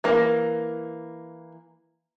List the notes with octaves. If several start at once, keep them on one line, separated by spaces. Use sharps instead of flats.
E3 A#3